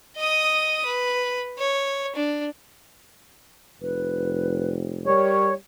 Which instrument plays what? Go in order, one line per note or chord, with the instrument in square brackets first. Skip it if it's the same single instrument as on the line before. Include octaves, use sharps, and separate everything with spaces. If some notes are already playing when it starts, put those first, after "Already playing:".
[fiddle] D#5 D#6
B4
C#5
D4
[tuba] F1 [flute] B4
[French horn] G3 [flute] A#4 [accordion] C#5